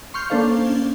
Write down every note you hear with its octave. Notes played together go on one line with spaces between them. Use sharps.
C6 C#6 F6 G6
A#3 C#4 D4 A4 C5 F5